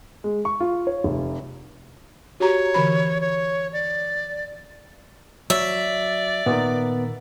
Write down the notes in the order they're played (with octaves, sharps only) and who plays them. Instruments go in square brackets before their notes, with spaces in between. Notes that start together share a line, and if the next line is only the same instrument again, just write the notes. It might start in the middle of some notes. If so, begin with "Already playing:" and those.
[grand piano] G#3
C#6
F4
C#5
F1
[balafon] F#4 G4 A#5 [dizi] C#5
[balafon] D3 E3 B5
[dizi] C#5
D5
[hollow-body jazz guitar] F#3 [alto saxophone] D5 [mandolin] E5
[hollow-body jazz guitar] A#2 D#3 A#4 [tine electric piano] B3